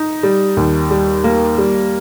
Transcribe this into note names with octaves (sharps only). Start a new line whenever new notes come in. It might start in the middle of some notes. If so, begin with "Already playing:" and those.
Already playing: D#4
G3
D#2
G3
A#3
G3